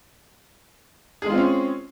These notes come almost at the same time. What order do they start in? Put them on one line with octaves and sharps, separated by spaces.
G#4 G#3 F4 C4 C#4